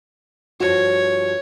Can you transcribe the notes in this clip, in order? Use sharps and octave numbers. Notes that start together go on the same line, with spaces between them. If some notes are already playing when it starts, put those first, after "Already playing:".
G2 F3 F#4 C#5